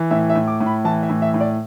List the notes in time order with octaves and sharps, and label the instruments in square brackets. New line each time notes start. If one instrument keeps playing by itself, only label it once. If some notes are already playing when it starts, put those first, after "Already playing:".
Already playing: [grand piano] E3
A2 E5
E5
A2
D6
A2
B5
E3 A5
E5
A2
E5
A2
D5